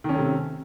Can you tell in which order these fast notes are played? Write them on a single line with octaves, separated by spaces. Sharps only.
D#3 C#4 A3 C3